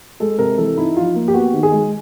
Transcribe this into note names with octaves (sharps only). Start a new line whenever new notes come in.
G#3 A4
C3 A#4
E3 A4
D#4 E4
F3 F4
A#3
G4
B3 F#4
D#3
G#4
G#3